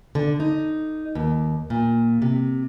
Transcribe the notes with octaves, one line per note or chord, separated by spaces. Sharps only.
D3
D#4
D#2
A#2
C3